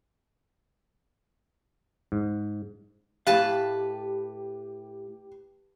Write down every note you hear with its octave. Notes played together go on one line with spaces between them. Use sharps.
G#2
A2 G4 B4 F5 A5